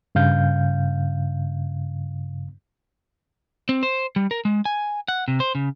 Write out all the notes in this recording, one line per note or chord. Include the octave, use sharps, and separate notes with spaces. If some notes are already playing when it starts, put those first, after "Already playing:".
G2 C#3 F5 G6
C4
C5
G3
A#4
G#3
G#5
F#5
C3
C5
C#3